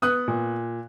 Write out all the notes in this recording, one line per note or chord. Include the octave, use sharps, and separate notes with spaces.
B3 D#6 F#6
A#2